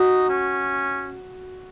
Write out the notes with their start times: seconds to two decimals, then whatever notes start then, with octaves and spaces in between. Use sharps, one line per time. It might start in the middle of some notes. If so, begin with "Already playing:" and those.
Already playing: D#4 F#4
0.29 C#4